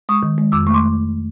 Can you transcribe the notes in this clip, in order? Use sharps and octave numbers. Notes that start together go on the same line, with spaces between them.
G#3 C#6 D#6
D#3
G#3
F2 D6 E6
A3 C#6
C6 D6